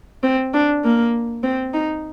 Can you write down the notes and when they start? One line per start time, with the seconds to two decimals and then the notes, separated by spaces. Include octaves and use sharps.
0.23 C4
0.54 D4
0.84 A#3
1.43 C4
1.74 D#4